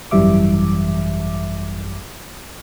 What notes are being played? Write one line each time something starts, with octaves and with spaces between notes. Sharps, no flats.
G#1 F#2 E3 G3 E5 D6